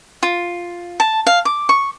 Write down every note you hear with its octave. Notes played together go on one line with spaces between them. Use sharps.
F4
A5
F5
D6
C#6